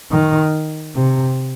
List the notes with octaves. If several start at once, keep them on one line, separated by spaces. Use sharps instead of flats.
D#3
C3